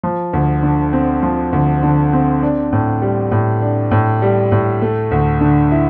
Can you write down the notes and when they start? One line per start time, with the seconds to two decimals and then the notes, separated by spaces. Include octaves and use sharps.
0.03 F3
0.33 D2
0.63 D3
0.93 C4
1.23 F3
1.52 D2
1.83 D3
2.13 C4
2.43 D4
2.72 A2
3.02 G3
3.32 A2
3.62 D4
3.91 A2
4.22 G3
4.52 A2
4.82 A3
5.11 D2
5.41 D3
5.72 E4